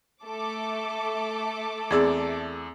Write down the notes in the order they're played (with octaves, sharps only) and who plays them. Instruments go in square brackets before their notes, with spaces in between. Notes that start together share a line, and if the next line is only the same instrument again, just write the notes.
[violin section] A3 A4 D6
[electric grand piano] E2 D5 E6 [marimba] C4 G#4 G#6